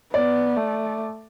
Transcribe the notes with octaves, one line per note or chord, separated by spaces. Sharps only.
B3 D5
A3